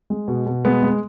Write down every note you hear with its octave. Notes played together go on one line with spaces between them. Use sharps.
G#3
B2
B2
G#3 B3
G#3